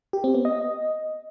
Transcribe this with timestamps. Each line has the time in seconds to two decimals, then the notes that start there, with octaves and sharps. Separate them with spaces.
0.13 G4
0.24 C4
0.34 B3
0.45 D#5